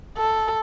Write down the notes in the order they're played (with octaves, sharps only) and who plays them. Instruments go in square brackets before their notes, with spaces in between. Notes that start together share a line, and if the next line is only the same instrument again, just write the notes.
[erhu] A4